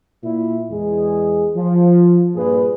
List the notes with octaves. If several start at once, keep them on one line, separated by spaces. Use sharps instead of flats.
A#2 E4
E2 G#3 G#4
F3
G2 A#2 G#4 B4